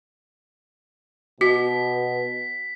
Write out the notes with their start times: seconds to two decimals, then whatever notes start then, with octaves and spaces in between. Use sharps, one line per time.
1.41 B2 F#4 B6